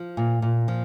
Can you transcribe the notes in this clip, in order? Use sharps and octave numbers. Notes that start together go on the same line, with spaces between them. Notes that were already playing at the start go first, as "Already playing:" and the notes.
Already playing: F3
A#2
A#2
F3